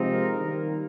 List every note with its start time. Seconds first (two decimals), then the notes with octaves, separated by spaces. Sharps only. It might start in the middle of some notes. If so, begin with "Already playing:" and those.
Already playing: C3 F3 G#3 C4 D#4
0.12 A#4
0.40 D#3 G3 A#3